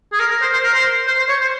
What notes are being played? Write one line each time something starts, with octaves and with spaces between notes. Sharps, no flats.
G#4
A#4
A#4
C5
C5
A#4
C5
C5
C5
C#5
C5